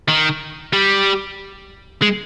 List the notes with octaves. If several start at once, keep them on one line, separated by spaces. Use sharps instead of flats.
D#3
G3
G#3